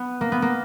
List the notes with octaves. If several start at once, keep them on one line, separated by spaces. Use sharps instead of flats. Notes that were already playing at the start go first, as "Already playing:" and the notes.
Already playing: B3
A#3
B3
A#3